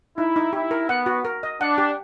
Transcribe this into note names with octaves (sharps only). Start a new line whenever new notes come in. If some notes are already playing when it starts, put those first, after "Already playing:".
D#4 E4
D#4
E4 G4
A#4
B3 F#5
F#4
A#4
D#5
D4 F#5
G4